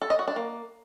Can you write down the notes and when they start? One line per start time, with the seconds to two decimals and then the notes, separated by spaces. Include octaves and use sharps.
0.02 A4
0.10 D#5
0.19 F#4
0.28 D4
0.36 A#3